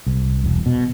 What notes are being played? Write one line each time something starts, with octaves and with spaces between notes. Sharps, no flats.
C2
E1
B2